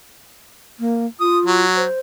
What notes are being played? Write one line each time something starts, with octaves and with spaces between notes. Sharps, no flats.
A#3
F4 D#6
F#3
C5